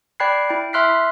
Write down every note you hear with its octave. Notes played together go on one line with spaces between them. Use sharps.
D5 G5 B5 F#6 G#6 C7
E4 G5
E5 C6 F6 F#6 B6 C7